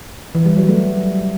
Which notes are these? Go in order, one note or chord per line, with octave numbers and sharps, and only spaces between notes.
E3
G3
F#3
A3